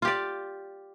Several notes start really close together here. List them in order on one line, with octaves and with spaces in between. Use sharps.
F4 G4 D5